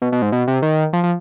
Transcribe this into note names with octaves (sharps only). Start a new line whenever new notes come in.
B2
B2
G#2
B2
C3
D#3
F3
F3